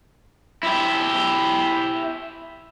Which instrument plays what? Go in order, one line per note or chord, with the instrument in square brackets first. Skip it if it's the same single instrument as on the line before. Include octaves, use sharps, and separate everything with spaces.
[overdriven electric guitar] E4 G4